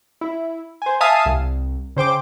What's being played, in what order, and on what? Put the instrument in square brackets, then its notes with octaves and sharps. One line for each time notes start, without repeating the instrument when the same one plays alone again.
[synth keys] E4
C5 G#5
E5 F5 G#5 A5 D#6 C7
C2
C#3 C5 G5 D6